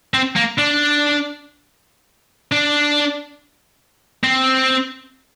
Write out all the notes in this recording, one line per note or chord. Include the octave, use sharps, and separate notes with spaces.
C4
A#3
D4
D4
C4